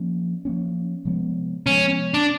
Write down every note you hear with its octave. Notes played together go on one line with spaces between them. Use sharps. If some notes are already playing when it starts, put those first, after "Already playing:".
Already playing: F3 A#3 C#4
F3 A#3 C#4
C3 F3 G#3 B3
C3 F3 G#3 B3 C#4
D4